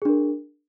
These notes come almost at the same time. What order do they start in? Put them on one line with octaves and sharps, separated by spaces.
G#4 D4 A#4